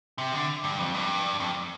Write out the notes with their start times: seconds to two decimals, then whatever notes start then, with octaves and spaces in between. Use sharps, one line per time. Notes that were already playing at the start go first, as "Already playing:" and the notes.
0.18 C3
0.33 D3
0.64 G2
0.79 F2
0.94 G2
1.40 F2